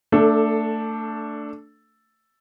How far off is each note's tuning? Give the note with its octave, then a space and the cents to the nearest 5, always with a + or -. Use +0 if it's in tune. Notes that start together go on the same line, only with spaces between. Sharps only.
A3 +25 D4 +0 A4 +0